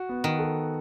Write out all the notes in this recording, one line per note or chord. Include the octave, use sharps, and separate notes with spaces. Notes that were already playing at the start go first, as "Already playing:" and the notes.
Already playing: F#4
B3
D#3
A4